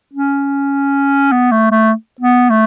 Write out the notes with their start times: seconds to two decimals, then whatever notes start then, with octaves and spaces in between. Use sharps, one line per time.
0.14 C#4
1.32 B3
1.52 A3
1.71 A3
2.20 B3
2.50 A3